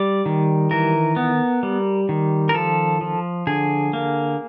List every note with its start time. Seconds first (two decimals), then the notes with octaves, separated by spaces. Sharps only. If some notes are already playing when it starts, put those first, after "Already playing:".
Already playing: G3 D5
0.26 D#3
0.71 E3 A#4
1.16 B3
1.63 G3
2.09 D#3
2.49 A#4
2.54 F3 A4
3.01 F3
3.47 D3 G#4
3.93 A#3